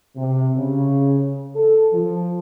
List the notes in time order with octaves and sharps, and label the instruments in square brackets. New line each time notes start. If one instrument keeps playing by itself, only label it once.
[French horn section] C3
C#3
A4
F3